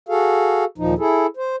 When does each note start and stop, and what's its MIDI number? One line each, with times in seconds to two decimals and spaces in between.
0.09 0.64 66
0.09 0.64 68
0.09 0.64 69
0.09 0.64 77
0.78 0.94 39
0.78 0.94 46
0.78 0.94 53
0.78 0.94 63
0.99 1.26 64
0.99 1.26 68
0.99 1.26 69
1.37 1.56 72